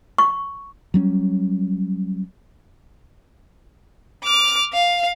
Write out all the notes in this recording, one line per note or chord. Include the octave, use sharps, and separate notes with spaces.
C#6
F#3 G3 C#4
D6 F6
F5